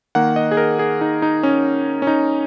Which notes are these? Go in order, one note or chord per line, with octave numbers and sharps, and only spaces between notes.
D#3 A#3 F#5
D#5
G#4
A#4
G#4
D#4
D#4
C#4
C#4
D#4